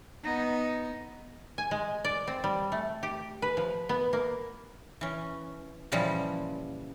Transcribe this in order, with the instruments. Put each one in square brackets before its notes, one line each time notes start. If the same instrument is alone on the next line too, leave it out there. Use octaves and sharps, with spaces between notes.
[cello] B3 D#4
[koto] G#5
G#3
D5
C4
G3
A3
G4
B4
F3
B3
A#3
[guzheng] E3 C#4
A#2 C#3 E3 F3 G3